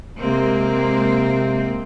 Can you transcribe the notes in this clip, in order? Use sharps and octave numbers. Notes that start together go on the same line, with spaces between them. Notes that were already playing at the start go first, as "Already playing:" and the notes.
C3 G#3 A#3 C4